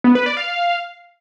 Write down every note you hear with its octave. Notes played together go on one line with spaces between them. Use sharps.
B3
B4
D5
F5